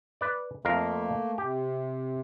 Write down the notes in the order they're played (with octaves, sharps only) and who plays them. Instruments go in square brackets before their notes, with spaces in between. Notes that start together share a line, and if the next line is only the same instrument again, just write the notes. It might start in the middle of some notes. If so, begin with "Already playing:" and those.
[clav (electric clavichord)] B4 D5
[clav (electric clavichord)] F2 A#4 F5 [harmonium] A3 A#3
[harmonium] C3 [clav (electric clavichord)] G4